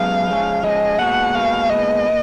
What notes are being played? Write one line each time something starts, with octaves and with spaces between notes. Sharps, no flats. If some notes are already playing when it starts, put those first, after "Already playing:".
Already playing: F#2 G#3 B3 F5
F3 G#3 C#4
F3 G#3 C#4 D#5
A#2 G#3 B3 F#4 F#5
A#2 G#3 B3 F#4 F5
A#2 G#3 B3 D#5
A#2